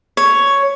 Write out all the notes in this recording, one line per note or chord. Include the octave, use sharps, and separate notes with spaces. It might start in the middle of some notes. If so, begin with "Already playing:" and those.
C#5